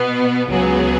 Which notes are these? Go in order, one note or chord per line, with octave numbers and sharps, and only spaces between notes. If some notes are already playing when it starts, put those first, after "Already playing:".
Already playing: B2 B3
C#2 C#3 F#3 B3 G#4